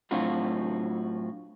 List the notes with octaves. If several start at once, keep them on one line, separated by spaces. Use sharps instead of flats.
A2 F#3 C4 D4 F4 F#4